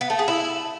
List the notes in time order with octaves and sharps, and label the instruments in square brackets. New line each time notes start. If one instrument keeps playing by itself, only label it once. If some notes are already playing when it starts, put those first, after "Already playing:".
[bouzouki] B3
A3
G#4
E4